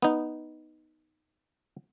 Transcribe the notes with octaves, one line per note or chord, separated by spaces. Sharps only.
B3 D#4